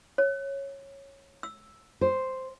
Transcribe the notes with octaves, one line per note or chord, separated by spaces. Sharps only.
C#5
E6
C5